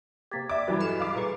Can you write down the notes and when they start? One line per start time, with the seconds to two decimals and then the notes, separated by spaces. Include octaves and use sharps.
0.31 C3 A#3 G4 G#6 A6 B6
0.50 D5 E5 D6
0.68 G2 E3 F#3 B4
0.80 A4 D#5 F6 C#7 E7
1.00 F5 D6
1.16 A#2 G#4 B4 A#5 C#6